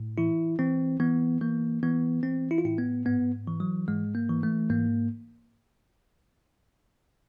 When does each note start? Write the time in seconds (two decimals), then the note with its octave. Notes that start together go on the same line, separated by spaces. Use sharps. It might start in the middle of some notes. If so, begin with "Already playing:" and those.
Already playing: A2
0.18 E3 E4
0.59 E3 C4
1.00 E3 B3
1.41 E3 A#3
1.83 E3 B3
2.23 E3 C4
2.51 E4
2.58 F4
2.65 A2 E4
2.78 B3
3.05 G#2 B3
3.47 E3
3.60 F#3
3.88 G#2 G#3
4.15 A#3
4.29 E3
4.43 A3
4.70 G#2 A#3